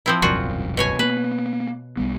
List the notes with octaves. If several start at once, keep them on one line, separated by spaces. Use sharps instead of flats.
F3 C4 E4
E1 C2 F#2 A#2 F4 F#4
B2 C#5 G#5
A#3 B3 B4
B1 G3 B3